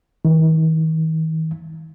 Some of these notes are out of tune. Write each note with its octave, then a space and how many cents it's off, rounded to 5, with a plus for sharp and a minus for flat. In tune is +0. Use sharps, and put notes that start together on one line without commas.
D#3 +45